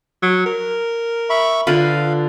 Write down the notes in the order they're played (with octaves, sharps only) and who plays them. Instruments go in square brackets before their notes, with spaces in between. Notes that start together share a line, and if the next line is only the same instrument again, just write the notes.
[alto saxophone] F#3
A#4
[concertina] E5 B5 C#6
[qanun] D3 F4 B4 [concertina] F5